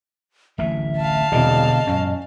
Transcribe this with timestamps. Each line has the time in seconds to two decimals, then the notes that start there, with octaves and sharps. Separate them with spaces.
0.58 D1 A1 E3 E5
0.98 F5 A5
1.32 E1 C2 B2 D3 D#5
1.87 F#2 A#2 C#4